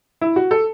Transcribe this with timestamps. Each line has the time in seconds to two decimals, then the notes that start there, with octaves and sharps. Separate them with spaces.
0.21 E4
0.36 F#4
0.51 A4